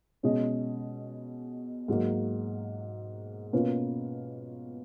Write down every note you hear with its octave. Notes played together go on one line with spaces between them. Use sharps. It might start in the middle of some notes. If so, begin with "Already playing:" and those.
B2 G#3 C#4 G#4 D#5
G#2 F#3 A#3
B2 A#3 C#4 F4 B4